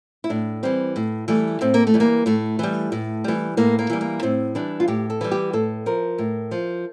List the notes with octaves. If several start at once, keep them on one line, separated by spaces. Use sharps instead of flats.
E4
A2 D4
E3 G3 C4
A2
E3 G3 A3
A2 C4
A#3
A3
E3 G3
A#3
A2 A3
E3 G3
A2
E3 G3
A2 A#3
A#3
E3 G3
A#3
A2 C4
E3 G3 D4
F4
A2 G4
A4
E3 G3
G4
A2 A4
F3 A#4
A2
F3